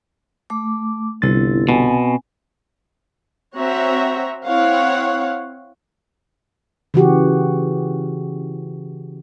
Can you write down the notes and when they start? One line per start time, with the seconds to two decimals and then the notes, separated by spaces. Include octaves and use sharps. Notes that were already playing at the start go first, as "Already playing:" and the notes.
0.50 A3 D6
1.22 G1 C2 C4 E4 A6
1.69 B2 C4 G#5
3.55 C4 F#4 C#5 E5 F#5 A#5
4.46 C4 E4 C#5 F5 F#5
6.94 C#3 E3 F#4 G4